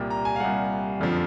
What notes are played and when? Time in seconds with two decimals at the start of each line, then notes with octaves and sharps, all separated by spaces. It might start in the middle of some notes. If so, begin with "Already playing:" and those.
Already playing: C2 A#2 G3
0.10 A#5
0.25 G#5
0.36 F5
0.40 C2 A#2 G3 F#5
1.00 F#1 F2 D3 F3